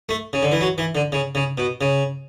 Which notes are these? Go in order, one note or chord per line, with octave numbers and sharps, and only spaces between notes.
A3
C#3
D3
E3
F#3
E3
D3
C#3
C#3
B2
C#3